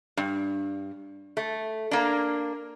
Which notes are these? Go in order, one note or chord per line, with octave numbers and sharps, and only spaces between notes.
G2
A3
A#3 D4